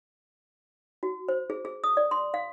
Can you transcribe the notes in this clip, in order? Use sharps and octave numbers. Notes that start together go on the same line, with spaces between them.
F#4
C5
G#4
G#4
D#6
D5
C6
F5